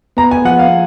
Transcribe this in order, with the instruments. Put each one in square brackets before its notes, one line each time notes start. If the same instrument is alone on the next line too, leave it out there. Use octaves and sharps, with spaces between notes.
[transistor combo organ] B3 [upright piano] A#5
[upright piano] G#5
[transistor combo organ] F3 [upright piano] F#5
[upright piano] F5